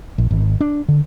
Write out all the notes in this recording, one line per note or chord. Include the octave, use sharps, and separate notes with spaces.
A#1
G#1
D4
D3